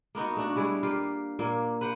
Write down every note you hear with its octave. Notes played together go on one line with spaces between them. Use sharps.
A#3 B3 D#4 F#4
A3 D4 F#4
G3 G#3 E4
A#3 F4 G4
A#2 A#3
B4 C5 F#5 G5